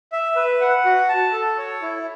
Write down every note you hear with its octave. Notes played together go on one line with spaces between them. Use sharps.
E5
B4
F#5
F#4
A5
A4
C#5
E4